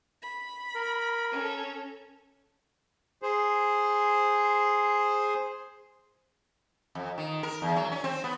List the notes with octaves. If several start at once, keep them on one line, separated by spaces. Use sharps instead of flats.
B5
A#4
C#4 A4
G#4 C5
F2
D#3
A#4
E2
F#3
C#4
C4
B3